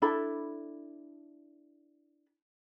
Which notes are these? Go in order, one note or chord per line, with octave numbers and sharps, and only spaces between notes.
D4 E4 A4 B5